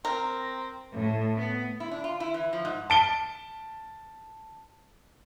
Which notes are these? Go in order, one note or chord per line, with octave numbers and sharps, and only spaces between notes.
C4 A#4
A2
B3
E4
D4
F4
E4
E3
F3
G#2
A5 D7 G7